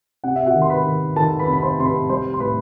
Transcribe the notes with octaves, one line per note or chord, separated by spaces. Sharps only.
C3 F#5
E5
F#4 F#5
D#3
C6
B4 B5
D#3
D#3 A4 A5
B4 B5
C3
B5
C5 C6
C3 C6
B4 B5
G3 C5 C6
C6
A2 B4 B5